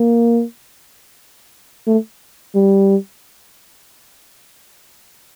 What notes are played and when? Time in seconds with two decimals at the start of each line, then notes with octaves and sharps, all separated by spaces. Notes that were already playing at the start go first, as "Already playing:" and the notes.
Already playing: A#3
1.87 A3
2.55 G3